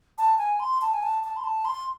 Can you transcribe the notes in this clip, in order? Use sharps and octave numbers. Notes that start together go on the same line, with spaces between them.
A5
G#5
C6
A5
G#5
A5
A5
C6
A5
C6